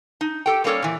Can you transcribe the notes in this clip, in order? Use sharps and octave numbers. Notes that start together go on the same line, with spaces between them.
D#4
G4 A4 G5
G3 A#3 C#4 A4 C#5 D5
A#2 E3